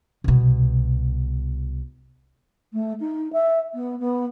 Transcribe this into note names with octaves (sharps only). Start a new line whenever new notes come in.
C2 B2
A3
D#4
E5
B3
B3